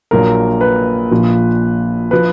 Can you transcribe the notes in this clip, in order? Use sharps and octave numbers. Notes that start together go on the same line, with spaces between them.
A#1 A#2 F#3 A#4
B4
A#1 A#2 F3
F3 B4